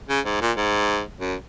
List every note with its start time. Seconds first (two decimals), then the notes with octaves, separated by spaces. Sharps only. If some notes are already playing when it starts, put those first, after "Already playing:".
0.09 C#3
0.25 G#2
0.41 A#2
0.57 G#2
1.20 F#2